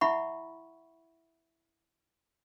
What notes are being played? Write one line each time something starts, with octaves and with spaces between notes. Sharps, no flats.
E4 E5 F#5 B5 C#6